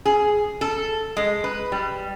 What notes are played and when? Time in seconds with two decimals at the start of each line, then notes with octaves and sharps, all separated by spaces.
0.05 G#4
0.61 A4
1.17 G#3
1.44 B4
1.72 G3